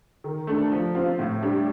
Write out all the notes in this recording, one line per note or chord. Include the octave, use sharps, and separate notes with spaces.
D#3
A3 D4 A4
F3
C4 F4
A2
G3 D4 G4